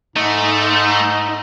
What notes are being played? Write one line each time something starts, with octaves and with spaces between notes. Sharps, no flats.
G#2 A3 D#4